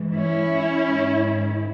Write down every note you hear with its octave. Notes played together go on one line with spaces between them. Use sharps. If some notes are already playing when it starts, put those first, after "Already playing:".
Already playing: G#2 E3
C#4 E4
G#2 D#3